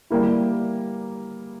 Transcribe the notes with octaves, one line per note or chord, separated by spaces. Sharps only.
G3 A#3 E4